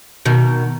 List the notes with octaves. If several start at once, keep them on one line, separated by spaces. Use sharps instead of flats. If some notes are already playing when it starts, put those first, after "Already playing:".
B2 D#3